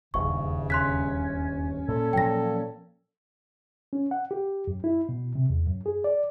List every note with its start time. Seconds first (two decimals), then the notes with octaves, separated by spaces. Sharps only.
0.14 D#1 E2 G2 C#3 C#6
0.70 C#4 C6 F#6 B6
1.88 A#2 A4
2.13 A#2 F3 F#3 G5 A#6
3.93 C#4
4.11 F#5
4.31 G4
4.67 F#2
4.84 E4
5.09 B2
5.35 C3
5.50 E2
5.67 F#2
5.86 G#4
6.04 D5